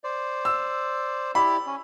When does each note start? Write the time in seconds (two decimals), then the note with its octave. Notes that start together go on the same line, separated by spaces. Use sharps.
0.04 C5 D5
0.45 E6
1.35 E4 G4 D5 B5
1.66 C#4